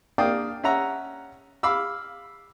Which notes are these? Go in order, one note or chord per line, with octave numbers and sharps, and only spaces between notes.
A#3 D4 D5 F5 G5 D#6
C#4 E5 F#5 A#5
F5 B5 D6 E6